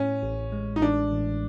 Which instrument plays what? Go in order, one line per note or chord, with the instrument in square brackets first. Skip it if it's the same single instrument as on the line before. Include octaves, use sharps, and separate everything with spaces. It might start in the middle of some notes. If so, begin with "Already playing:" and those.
Already playing: [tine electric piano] A2 [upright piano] C#4
[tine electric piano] A1
G#3
[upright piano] D#4
[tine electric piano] A1 [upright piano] D4
[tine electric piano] A1